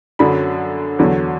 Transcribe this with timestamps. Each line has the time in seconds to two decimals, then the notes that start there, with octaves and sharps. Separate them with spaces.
0.19 F#2 D3 F#3 B5
0.99 E2 D3 F#3